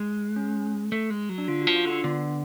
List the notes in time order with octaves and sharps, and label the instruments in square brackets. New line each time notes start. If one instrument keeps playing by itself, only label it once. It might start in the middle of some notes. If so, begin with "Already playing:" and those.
Already playing: [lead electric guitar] G#3
[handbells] C#4
[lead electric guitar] A3
G#3
F#3
[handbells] D4
[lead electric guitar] D3 [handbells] F4
[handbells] F#4
[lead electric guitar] F3
[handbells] F4
[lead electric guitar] D3 [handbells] D4
[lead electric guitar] D3 [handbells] B3